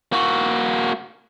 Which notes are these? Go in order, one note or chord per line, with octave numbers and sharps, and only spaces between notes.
A#3 F#4